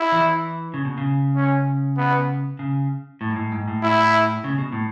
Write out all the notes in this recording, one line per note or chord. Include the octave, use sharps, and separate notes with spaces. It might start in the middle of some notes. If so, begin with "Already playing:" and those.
Already playing: E4
E3
C#3
B2
C#3
C#4
B3
C#3
A2
G#2
A2
G#2
A2
E4
C#3
B2
A2